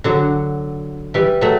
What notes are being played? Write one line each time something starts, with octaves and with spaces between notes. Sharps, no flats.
D3 F#3
E3 G3
F#3 A3